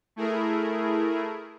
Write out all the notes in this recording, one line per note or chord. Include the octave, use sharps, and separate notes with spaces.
A3 E4 G#4 A#4